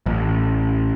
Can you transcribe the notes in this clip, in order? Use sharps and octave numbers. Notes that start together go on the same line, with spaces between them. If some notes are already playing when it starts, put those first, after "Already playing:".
A1